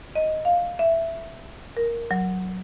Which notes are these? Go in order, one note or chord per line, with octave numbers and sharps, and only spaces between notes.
D#5
F5
E5
A#4
F#3